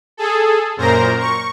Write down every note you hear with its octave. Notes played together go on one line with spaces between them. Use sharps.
G#4 A4
F#2 A#2 A#4 C5 A#5
C#6